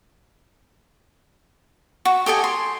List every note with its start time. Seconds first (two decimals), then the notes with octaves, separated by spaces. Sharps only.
2.05 F#4
2.26 G4 A4 D#5 G#5
2.44 C6